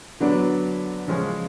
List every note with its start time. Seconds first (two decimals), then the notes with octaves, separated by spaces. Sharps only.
0.20 D3 F#3 B3 D4
1.08 C#3 F3 G#3 C#4